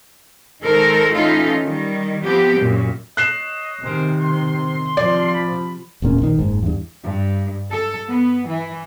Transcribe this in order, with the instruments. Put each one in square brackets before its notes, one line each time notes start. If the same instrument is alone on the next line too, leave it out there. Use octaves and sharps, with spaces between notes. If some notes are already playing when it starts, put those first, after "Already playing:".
[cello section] D#3 G#3 A4 A#4 C5
E3 A3 C#4 D#4 F4 A4
D#3 G3
F3 B3 C4 G4
F#2 A#2
[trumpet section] C#5 D#5 [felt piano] F#6 C7 E7
[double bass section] C3 D#3 [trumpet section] G#4 A#4 C5
[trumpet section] C6
[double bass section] C3 F3 [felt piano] D5
[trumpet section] B5
[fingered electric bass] D1 E2 A#2 C#4
A#1 D#3
F#1 G#2
E2 G2
[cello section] G2
A4
B3
E3